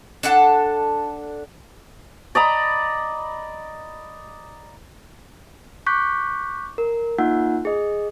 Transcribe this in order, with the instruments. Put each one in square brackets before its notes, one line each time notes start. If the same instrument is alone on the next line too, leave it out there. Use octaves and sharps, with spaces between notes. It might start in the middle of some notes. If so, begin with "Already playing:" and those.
[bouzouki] D4 A4 F#5
[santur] D5 D#5 A#5 B5
[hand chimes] C#6 D6 F#6 G6 B6
A#4
A#3 D#4 F4 F#5
G#4 D#5